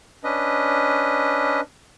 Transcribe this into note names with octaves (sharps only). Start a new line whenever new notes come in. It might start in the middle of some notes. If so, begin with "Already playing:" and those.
C#4 D4 B4 D#5